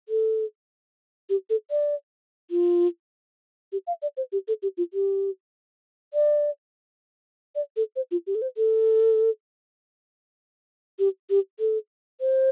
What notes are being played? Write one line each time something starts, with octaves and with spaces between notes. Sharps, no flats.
A4
G4
A4
D5
F4
G4
F5
D5
C5
G4
A4
G4
F4
G4
D5
D5
A4
C5
F4
G4
A4
C5
A4
G4
G4
A4
C5